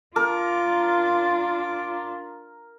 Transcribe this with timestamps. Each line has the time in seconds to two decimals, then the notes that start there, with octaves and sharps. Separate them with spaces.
0.16 D4 F4 A#4 D6